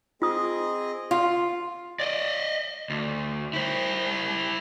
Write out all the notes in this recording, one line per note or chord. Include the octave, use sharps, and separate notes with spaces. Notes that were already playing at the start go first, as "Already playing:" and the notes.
C4 F4 G#4 D#5 D#6
F4
D5 D#5
D2
E4 C5